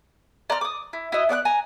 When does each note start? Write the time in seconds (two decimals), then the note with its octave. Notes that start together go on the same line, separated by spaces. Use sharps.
0.50 D5 A#5 C6 F6
0.61 D6 D#6
0.93 E4
1.12 E4 F#4 D#5
1.29 B3 D5 F5 F#6
1.45 G#5 A#5